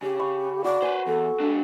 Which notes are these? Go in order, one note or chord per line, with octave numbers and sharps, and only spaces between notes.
C#3 G4
F5 B5 C#6
F#4 D5
B4 C5 G#5
E2 A4
G#3 D4